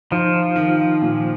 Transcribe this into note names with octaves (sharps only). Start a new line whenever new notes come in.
F3 D#4
D#3
A#2